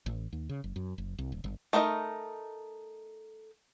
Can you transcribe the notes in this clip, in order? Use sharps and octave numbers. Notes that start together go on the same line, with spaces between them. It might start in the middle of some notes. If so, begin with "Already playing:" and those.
A1
D#2
C#3
F#1
F#2
F#1
C2
D#1
G1
A3 D#4 A#4 B4 D#5